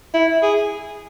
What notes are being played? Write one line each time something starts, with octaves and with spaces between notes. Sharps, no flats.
E4
G#4